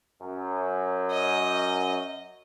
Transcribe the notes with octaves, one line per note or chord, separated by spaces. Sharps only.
F#2
D#5